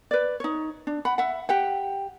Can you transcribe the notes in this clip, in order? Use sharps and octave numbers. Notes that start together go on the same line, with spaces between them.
B4 D5
D#4 C#5
D4
F#5 B5
E5 F#5
G4 F#5 G5